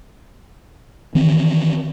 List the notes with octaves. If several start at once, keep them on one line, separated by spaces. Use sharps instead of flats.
D#3 E3 C4